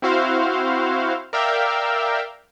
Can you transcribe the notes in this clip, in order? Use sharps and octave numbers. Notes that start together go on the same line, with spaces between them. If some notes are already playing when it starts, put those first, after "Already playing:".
C4 E4 F#4 C5 F5
A#4 D5 E5 F5 G5